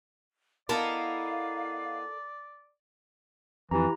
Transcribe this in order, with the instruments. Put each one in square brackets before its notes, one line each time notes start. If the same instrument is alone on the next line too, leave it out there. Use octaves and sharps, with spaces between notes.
[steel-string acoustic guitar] B3 E4 D#5 [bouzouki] A4 A#4 [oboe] D5 [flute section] F5
[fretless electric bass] F2 [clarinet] E3 [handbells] E4 G4 A#5